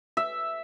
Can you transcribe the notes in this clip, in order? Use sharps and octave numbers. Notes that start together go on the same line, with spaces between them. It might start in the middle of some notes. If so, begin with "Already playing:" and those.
E5